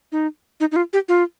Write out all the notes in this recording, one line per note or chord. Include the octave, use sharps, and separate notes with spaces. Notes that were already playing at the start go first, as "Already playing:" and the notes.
D#4
D#4
D#4
F4
G4
F4